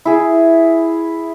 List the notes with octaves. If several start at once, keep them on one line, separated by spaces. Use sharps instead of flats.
E4 G#4